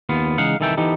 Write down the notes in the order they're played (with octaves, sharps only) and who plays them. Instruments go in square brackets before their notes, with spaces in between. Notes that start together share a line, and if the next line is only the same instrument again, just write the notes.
[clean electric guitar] D#2 B3 F4
C#3 E3 G#3 D#4 F5 F#5
C2 D#3 E3 A4 E5 G5
E3 B3 D#4 G4 A4